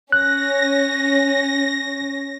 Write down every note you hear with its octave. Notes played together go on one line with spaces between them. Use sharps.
C#4 F#6 A#6